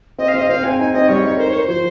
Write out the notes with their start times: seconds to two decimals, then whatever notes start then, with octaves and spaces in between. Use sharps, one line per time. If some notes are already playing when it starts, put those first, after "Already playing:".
0.18 C4 D#5
0.28 F5
0.34 C4 D#5
0.49 C4 F5
0.63 C4 G#5
0.79 D#4 G#5
0.93 C4 D#5
1.08 G3 C#5
1.23 D#4
1.38 A#4 C5
1.50 C#5
1.53 A#4 C5
1.68 F3 C5